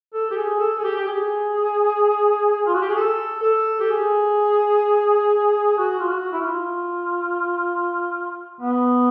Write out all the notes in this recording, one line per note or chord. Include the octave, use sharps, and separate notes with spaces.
A4
G4
G#4
A4
G#4
G4
G4
G#4
F4
F#4
G4
G#4
A4
A4
G4
G#4
F#4
F4
F#4
E4
F4
B3